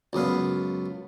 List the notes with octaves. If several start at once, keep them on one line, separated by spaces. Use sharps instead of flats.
C#2 F#2 B3 F5